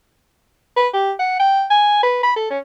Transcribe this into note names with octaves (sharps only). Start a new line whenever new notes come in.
B4
G4
F#5
G5
G#5
B4
B5
A4
C#4